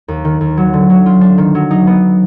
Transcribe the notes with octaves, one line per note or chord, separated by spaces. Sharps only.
D#2
D#3
D#2
F#3
D3
F#3
F4
D4
D#3
F#3
D#4
B3